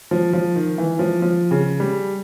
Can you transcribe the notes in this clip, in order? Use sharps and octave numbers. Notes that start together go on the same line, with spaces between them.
F3
F3
D#3
E3
F3
F3
C#3
G3